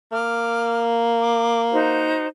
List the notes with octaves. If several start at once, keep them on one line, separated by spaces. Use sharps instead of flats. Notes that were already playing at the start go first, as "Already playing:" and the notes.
A#3 D6 F6
D6
D#4 F#4 C5